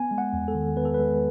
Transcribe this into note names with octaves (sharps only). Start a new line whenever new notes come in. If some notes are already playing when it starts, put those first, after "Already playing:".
Already playing: B3 G#5
G#3
F#5
E2
A4
D#3
B3 B4
A4
G#3 B4